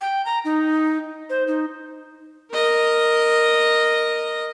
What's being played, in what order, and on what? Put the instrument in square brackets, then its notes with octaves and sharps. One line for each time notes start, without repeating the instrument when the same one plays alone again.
[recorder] G5
A#5
D#4
C5
D#4
[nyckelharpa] A#4 D#5